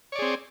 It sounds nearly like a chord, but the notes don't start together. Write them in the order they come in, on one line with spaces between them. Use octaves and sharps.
C#5 D5 G#4 C4